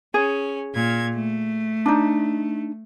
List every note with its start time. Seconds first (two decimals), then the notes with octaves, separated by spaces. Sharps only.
0.14 C#4 G#4
0.73 A#2 G#6
1.14 A3
1.86 D4 D#4